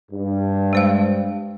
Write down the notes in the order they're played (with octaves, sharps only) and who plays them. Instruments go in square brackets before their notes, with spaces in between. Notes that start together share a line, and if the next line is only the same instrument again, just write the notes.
[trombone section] G2
[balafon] G#3 C5 F5